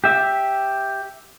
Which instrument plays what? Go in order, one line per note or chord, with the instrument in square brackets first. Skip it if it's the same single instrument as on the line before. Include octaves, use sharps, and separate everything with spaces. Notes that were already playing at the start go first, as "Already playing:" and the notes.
[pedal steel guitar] G4 E5